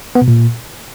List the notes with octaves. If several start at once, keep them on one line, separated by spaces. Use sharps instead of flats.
B3
B2
A#2